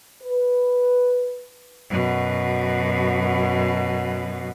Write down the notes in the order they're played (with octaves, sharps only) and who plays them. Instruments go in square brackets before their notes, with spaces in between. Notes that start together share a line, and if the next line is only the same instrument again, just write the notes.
[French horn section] B4
[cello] F#2 B2